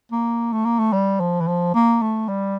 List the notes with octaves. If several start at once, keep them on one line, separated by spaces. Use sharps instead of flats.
A#3
A3
A#3
A3
G3
F3
E3
F3
A#3
A3
G3